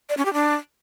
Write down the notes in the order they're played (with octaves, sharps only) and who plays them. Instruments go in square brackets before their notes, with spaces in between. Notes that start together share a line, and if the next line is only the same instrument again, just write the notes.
[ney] D5
C#4
G4
D4